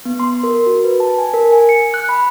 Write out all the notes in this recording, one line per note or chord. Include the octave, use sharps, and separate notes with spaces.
B3
C6
A#4
F#4
B4
A5
G#5
A#4
G#5
C#7
F#6
B5